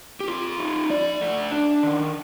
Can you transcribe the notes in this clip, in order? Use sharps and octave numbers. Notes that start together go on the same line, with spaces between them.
G4
C4 F4
D#4
F3 D5
A3
D4
D#3